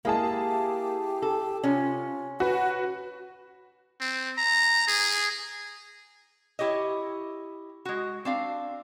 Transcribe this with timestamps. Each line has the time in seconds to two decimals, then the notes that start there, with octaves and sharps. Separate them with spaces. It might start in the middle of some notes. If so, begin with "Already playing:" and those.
0.05 G#3 A#3 E4 G#4 A5
0.20 G4
1.22 A4
1.63 C3 C#4 F4
2.40 F#4 B4 F#5
4.01 C4
4.38 A#5
4.88 G#4
6.59 E4 G4 C#5 D#5
7.85 G#3 F#4
8.25 C4 D4 F5